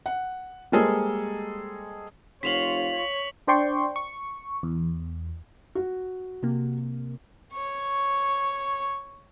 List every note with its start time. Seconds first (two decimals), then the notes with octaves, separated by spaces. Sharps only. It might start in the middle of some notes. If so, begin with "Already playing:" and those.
0.06 F#5
0.72 G3 G#3 A#3 G#4 A4 C5
2.43 F1 F4 C5 C#5 B6 F7 F#7
2.92 C#5
3.47 D4 C5 D5 G5 C6 C#6
3.96 C#6
4.63 E2
5.75 F#4
6.43 C3 A#3
7.52 C#5 C#6